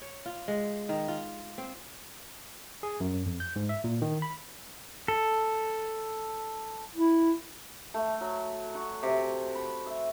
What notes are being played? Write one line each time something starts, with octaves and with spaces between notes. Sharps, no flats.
C#5
F4
G#3
D#3
F4
C4
G#4
F#2
F2
G6
G#2
E5
A#2
D#3
B5
A4
E4
A3
F#3
F#4
C3
B5
E5